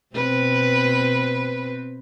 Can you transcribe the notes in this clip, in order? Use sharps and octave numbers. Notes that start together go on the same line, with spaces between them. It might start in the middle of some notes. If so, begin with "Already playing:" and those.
B2 C4 B4